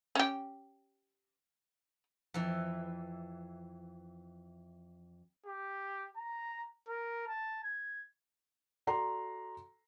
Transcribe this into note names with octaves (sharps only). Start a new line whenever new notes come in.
C#4 G4
F2 E3
G4
A#5
A#4
A5
G#6
F#4 A4 D5 A#5 C6